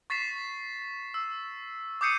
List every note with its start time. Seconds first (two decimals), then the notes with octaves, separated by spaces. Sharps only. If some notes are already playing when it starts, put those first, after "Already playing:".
0.10 C#6 A6 B6 C7 E7
1.14 E6
2.01 D6 D#6 G6 C7 C#7 D#7